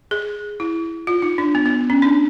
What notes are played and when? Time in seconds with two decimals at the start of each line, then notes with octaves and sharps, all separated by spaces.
0.11 G#4
0.60 E4
1.07 F4
1.22 D#4
1.38 D4
1.55 B3
1.66 B3
1.90 C#4
2.02 D4